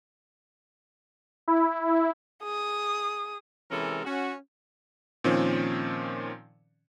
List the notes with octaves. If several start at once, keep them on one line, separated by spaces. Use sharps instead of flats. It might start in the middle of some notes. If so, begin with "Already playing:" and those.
E4
G#4 D#6
C3 E3 G#3 C#4 A4 A#4
C#4 F#4
A#2 D#3 F3 C4 C#4